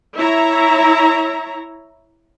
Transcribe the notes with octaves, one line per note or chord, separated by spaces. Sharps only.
E4 C#5 E5 A#5